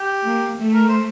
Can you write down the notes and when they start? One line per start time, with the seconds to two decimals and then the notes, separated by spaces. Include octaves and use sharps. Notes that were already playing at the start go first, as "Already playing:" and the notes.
Already playing: G4
0.25 A#3
0.57 A3
0.73 A#4
0.89 C5